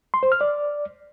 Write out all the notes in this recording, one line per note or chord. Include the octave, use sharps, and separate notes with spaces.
C6
C5
F6
D5